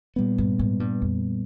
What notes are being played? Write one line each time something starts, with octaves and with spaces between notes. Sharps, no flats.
A#2 G3 B3
G2
G#2
G2
F2